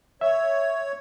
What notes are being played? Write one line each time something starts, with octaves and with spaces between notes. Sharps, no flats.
C#5 E5